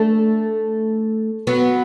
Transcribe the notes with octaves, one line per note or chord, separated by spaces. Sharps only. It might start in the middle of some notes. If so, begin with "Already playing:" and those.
Already playing: A3 D4
F#3 B3